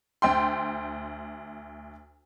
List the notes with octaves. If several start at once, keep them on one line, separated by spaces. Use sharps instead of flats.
D2 G5 C6